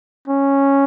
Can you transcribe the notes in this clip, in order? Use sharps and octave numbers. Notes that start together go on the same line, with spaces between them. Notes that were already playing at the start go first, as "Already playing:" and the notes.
C#4